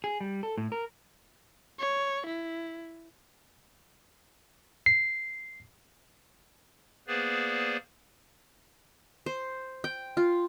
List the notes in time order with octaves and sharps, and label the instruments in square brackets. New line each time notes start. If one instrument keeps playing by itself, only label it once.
[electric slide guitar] G#4
G3
A4
A2
A#4
[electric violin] C#5
E4
[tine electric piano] C7
[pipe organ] A#3 B3 G#4 B4 C5 D5
[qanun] C5
G5
F4